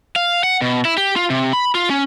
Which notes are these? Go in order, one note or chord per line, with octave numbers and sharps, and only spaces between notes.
F5
F#5
B2
E4
G4
F4
C3
B5
F4
C#4